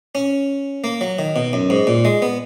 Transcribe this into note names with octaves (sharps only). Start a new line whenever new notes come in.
C#4
A#3
F#3
D#3
B2
F#2
G#2
A#2
G#3
B3